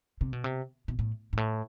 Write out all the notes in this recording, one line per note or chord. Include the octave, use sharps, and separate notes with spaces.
C3
B2
C3
B2
A2
G#2
A2